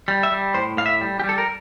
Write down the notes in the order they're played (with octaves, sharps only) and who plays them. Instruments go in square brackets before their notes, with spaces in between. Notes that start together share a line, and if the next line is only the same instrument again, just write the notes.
[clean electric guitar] G3
E5
G3
A2 C5
A2 F5
E5
G3
G4
G3
A4
A#4